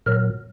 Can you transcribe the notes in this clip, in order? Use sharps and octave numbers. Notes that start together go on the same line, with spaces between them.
A#2 F#3 A#4